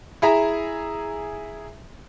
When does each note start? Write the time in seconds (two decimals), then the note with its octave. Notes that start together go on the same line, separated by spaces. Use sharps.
0.22 E4 G#4 E5 A#5